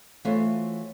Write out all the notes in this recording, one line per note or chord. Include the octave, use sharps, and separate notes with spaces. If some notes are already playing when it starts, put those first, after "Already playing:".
E3 A3 F4 F#4 C5 C#5